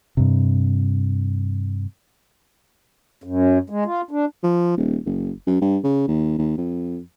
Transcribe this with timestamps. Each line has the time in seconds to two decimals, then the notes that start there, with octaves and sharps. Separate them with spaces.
0.17 G2 C3
3.24 F#2
3.70 G#3
3.85 F4
4.11 D4
4.43 F3
4.77 D#1
5.06 F#1
5.47 F#2
5.61 G2
5.84 C#3
6.08 D#2
6.39 D#2
6.58 F2